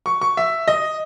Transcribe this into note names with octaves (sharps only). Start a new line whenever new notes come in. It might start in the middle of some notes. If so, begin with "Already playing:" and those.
C#6
C#6
E5
D#5